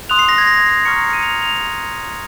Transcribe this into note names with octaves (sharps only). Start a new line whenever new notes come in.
C6 D#6 F#6 F7
C7
A#6
G#6
A#6
C7
A#5 C#6 F6 C#7
C#7
D#7
F7
F7